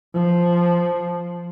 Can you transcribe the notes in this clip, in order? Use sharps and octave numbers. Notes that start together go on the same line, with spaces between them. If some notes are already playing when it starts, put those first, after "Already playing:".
F3